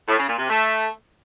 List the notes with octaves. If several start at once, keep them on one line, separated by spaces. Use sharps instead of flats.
A2
C#3
A#2
C3
A3